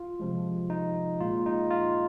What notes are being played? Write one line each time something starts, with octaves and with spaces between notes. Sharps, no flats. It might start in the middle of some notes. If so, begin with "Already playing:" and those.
Already playing: F4
C3 F3 G#3
D#4
A#2 G#3 F4
D#4
F4